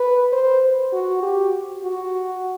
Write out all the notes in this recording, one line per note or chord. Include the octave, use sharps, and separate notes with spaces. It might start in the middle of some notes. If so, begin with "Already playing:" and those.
Already playing: B4
C5
F#4
G4
F#4